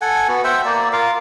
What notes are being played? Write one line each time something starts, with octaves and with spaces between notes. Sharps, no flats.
A4 F#5 G#5
B3 F#4
C5 E5 F#5 G5
A#3 D5
F4 A#4 F5